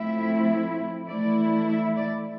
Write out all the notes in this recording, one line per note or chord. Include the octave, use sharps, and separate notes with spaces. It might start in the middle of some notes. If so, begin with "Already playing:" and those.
Already playing: A2 F3 A3 C4 E4 E5
E3 A3 E4 D5
E5
D5